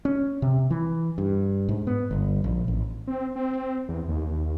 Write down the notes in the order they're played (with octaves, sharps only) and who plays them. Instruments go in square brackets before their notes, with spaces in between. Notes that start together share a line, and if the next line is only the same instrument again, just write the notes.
[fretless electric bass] C#4
C3
E3
G2
G#2
B3
G1
A#1
A1
[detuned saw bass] C4
C4
E2
D#2